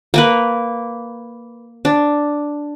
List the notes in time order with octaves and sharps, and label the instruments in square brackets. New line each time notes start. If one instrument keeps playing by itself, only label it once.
[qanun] A#3 A#4 B4
D4